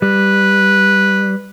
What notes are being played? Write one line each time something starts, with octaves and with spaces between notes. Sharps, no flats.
G3 B4